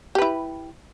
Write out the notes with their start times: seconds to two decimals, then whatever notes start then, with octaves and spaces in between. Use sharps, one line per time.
0.15 G4
0.18 B4
0.22 E4